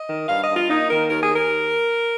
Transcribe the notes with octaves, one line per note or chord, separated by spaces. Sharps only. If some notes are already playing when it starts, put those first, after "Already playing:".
Already playing: D#5
D#3
G2 F5
D#5
G2
F4
A#3 D#4
D#3 A#4
D#2 A#4
G#4
D#2
A#4